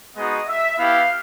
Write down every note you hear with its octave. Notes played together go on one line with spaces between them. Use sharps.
G#3 B3 D#4 F#4 D#5
E5
B3 E4 G4 F5